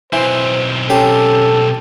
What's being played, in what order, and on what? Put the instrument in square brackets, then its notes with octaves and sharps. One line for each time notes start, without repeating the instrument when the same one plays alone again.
[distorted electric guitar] B1 C4 [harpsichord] E3 [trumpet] C5
[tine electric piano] C#4 [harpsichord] G4 C6 [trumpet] A4